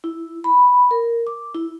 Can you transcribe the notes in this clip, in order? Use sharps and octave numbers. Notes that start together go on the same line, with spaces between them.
E4
B5
A#4
D6
E4